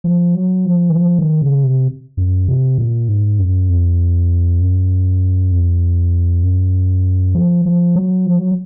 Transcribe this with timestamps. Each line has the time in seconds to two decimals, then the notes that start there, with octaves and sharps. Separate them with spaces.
0.04 F3
0.35 F#3
0.66 F3
0.90 D#3
0.95 F3
1.19 D#3
1.41 C#3
1.64 C3
2.17 F#2
2.48 C3
2.78 A#2
3.08 G#2
3.39 F#2
3.70 F2
4.61 F#2
5.52 F2
6.43 F#2
7.35 F3
7.66 F3
7.96 F#3
8.26 F3
8.39 F#3